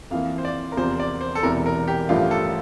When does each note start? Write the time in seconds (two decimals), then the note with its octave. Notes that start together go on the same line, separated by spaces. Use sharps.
0.11 F2 E3 A#3 F5
0.38 C5
0.45 D5
0.72 A#4
0.77 E2 C3 F3 C5
1.00 D5
1.21 C5
1.35 A4
1.43 E1 E2 C3 E3 A#4
1.66 A#4
1.88 G4
2.09 A1 G2 F3 A3 F4
2.31 A4